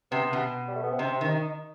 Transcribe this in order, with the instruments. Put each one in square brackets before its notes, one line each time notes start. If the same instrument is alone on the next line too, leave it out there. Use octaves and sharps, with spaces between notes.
[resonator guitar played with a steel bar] C3 [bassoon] B3
[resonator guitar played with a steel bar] B2
[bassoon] G3
A3
B3
C4
[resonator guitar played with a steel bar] C3 [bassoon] D#4
[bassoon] C4
[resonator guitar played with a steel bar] D#3
[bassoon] D#4
D#4